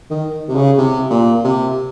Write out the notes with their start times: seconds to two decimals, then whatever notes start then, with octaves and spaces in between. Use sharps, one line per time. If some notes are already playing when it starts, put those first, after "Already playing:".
0.11 D#3
0.48 C3
0.56 C#3
0.78 C3
1.10 A#2
1.44 C3